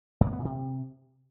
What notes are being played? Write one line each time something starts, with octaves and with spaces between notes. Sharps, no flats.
F#2
A#3
B3
A#2
C3